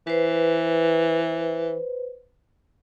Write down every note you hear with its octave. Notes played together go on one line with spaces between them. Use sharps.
E3 B4 C5